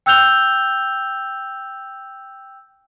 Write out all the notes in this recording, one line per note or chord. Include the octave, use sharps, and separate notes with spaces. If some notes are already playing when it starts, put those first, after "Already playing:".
G5 E6 F#6 G6 F7 G7